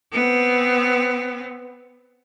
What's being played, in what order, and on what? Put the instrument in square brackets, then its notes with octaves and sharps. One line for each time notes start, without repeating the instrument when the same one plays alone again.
[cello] B3 C4